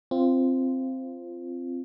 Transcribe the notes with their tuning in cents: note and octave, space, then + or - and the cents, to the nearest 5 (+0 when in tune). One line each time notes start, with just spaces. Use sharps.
C4 +0 F4 -15